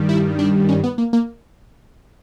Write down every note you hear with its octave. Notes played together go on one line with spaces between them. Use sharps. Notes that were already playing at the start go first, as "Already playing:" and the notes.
Already playing: G2 D#3 G3
E4
D4
C#4
B3
A#3
A#3